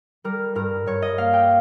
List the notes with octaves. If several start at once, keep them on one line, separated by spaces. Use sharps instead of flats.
G3 A#4
G2 A#4
G2 C#5
D#5
A#3 F5
G5